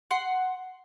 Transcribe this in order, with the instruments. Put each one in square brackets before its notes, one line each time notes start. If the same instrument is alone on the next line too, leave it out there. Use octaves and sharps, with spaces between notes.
[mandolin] F#5 C6